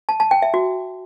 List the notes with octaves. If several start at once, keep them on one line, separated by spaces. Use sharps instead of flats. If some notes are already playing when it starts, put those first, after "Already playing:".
A5
A5
G5
E5
F#4